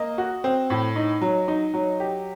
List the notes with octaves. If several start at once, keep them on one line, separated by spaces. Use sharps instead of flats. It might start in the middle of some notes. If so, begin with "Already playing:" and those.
Already playing: A#3 D#5
F#4
C4
A2
D#4
F#3
D#4
F#3
G4